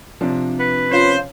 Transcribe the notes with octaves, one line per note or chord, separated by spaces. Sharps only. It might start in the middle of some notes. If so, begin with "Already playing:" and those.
C3 F3 D4
B4
C#4 F4 C5